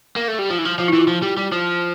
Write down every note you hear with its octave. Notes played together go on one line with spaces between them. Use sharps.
A#3
A3
G3
F3
E3
F3
F3 F4
E4
E3 F4
F3
G3
G3
F3